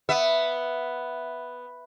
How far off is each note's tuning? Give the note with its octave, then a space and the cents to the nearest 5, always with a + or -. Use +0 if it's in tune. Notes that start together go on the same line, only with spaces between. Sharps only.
B3 +0 E5 +5